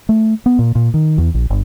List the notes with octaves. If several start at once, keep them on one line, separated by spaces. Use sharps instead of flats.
A3
B3
A#2
A#2
D#3
E2
A#1
G1